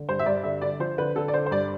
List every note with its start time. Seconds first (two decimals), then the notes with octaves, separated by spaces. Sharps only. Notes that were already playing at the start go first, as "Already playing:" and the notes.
Already playing: D3
0.09 G2 C5
0.19 E5
0.26 G2 D5
0.43 D3 E5
0.62 D3 D5
0.80 F3 C5
0.98 D3 B4
1.16 D3 A4
1.28 D5
1.34 D3 C5
1.46 C5
1.51 G2 D5